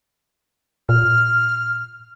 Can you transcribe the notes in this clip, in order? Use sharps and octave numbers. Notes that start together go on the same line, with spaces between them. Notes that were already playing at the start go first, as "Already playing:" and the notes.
A#2 F6